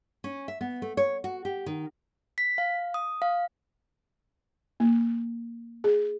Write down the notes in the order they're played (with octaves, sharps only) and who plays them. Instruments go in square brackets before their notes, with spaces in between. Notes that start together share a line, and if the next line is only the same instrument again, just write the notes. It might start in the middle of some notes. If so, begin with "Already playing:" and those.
[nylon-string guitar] C#4
E5
B3
A3
C#5
F#4
G4
D#3
[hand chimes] B6
F5
D#6
F5
[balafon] A#3
G#4